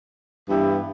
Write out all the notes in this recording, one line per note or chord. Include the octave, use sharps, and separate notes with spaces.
G2 E3 B3 E4 G4